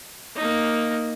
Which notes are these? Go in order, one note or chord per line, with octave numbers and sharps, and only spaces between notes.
A#3 D#4